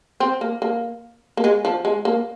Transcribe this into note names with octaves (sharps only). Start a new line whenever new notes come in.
C4
A#3
A#3
A#3
G#3
F3
G#3
A#3